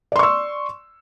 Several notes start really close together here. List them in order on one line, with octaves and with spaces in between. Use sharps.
D5 C6 C#6 E6